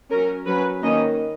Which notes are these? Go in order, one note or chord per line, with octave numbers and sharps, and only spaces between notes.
F#3 C#4 A#4
F#3 C#4 B4
D#3 A#3 C#4 D#5